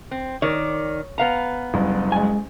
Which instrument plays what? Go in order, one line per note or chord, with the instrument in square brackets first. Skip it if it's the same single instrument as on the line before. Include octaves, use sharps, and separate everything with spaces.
[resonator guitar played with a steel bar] C4
[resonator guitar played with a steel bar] D#3 D5 [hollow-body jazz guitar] C#5
[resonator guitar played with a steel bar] B3 F5 A#5
[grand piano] F#1 C2
[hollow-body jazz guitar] G#3 G#5